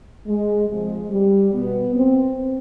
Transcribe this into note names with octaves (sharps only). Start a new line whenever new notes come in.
G#3
C3 F3 G#3
G3
B2 B3
C4